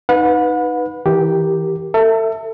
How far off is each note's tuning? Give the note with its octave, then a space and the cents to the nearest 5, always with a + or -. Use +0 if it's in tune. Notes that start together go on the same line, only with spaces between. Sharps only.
D#4 +0 B4 +0 F#5 -40
E3 -20 G4 +0 A#4 +0
A4 +35 E5 +0